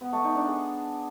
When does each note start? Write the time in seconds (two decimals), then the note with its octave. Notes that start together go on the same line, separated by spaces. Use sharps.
0.01 B3
0.13 A3
0.24 D#4
0.36 D4
0.47 G#4